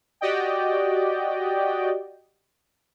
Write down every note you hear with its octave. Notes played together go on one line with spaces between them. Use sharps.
F#4 G4 D5 D#5 G5